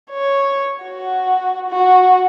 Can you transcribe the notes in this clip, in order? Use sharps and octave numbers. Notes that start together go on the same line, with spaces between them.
C#5
F#4
F#4